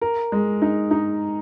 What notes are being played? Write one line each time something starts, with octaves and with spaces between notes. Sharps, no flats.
A#4
G#3
D#4
D#4